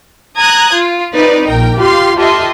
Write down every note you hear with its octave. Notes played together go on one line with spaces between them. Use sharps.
A#5 D#6 F#6 G#6
F4
C4 D#4 B4 D5
A#1 A#4 G5
F4 G4 F5 C6
F4 G4 A4 D#5 E5 C6